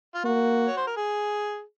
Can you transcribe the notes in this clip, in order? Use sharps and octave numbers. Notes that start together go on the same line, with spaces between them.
F4
A#3 F#4
C#5
C5
A#4
G#4